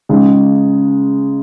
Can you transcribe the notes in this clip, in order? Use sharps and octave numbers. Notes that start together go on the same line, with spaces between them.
C#3 G#3 D#4 G#4